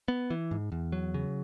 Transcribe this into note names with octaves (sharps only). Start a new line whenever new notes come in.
B3
E3
G#2
E2
F#3
C#3